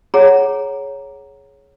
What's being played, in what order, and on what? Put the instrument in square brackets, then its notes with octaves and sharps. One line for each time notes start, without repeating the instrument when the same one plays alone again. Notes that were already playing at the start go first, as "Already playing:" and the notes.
[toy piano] G#4 C#5 F#5 A#5